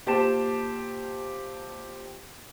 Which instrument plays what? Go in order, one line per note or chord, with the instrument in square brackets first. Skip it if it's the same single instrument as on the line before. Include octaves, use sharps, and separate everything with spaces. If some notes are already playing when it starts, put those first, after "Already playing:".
[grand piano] A#2 G4 C5 A5 E7